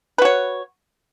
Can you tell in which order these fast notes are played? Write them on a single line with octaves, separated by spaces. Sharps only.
B4 F#4 C#5